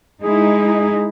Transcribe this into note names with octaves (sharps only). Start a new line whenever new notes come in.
G#3 D#4 E4 G#4